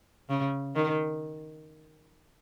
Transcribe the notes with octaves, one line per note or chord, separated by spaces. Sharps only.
C#3
D#3